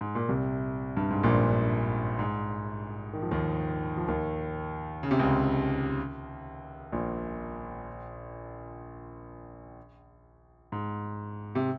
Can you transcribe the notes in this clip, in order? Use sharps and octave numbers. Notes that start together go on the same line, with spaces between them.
G#2
A#2
C2 C3
G2
G#2
A#1 A#2
G#2
D#3
F3
D#2 D#3
F3
D#2 D#3
C#3
C3
C#2 C#3
A#1 A#2
G#2
C3